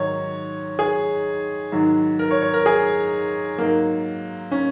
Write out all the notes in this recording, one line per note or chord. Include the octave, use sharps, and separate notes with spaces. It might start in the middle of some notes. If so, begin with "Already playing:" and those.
Already playing: G#2 D#3 F#3 C#5
G#4
G#2 D#3 F#3
A#4
C#5
C#5
A#4
G#4
G#2 F#3 A#3
C#4